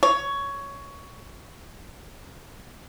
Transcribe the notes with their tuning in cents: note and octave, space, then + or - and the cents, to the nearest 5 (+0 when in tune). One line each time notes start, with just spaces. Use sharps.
C#5 +10